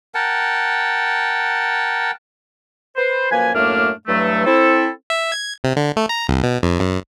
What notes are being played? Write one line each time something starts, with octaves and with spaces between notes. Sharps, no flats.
A#4 F#5 G5 A5
B4 C5
F#2 F3 A#3 B4 G#5
F#2 A2 A3 A#3 D4 F6
G2 E3 F#3 A3
C4 E4 A4
E5
G#6
C3
D3
A3
A#5
C2
B2
F2
F#2